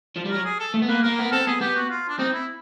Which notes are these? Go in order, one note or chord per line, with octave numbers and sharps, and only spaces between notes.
F3
G3
A#4
F#3
G#4
A4
A3
B3
A#3 B4
A#3 A#4
B3
C4 A4
B3 G#4
B3 G4
F#4
F4
D4
C4 D#4
E4